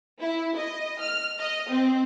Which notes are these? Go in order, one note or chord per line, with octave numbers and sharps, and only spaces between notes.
E4
D#5
F6
D#5
C4